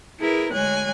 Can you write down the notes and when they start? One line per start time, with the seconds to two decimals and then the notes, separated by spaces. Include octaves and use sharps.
0.20 E4 G#4 A#4 B4
0.53 D2 G#3 C#5 G#5 F#6